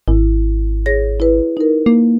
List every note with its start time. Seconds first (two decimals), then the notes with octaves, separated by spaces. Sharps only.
0.08 G#1 E4
0.86 G#4 C#5 A#6
1.20 E4 B4
1.57 D#4 A#4
1.86 A#3